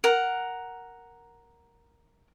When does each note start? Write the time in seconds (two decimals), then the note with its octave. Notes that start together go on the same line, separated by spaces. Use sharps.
0.04 A#4 F#5